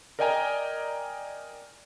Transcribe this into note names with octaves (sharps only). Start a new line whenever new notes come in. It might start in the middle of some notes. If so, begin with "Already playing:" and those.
A#4 D5 D#5 G5 G#5 A#5